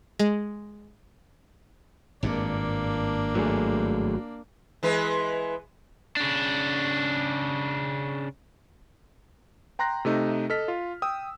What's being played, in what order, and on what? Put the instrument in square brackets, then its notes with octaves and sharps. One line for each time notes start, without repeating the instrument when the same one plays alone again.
[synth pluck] G#3
[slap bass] G#1 G2 A#2 [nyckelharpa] A#3 D4
[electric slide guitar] F#3 A3 G#4
[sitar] E3 G#3 B4
[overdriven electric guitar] C#3 D4
[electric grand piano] G5 A#5 C6 F#6 A#6
C3 A3 D#4
A4 D#5 F6 B6
F4
G5 D#6 E6